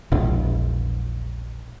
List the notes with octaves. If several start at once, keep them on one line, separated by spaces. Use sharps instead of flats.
E1 A#1